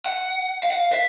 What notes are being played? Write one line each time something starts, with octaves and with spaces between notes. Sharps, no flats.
F#5
F5
F#5
F5
E5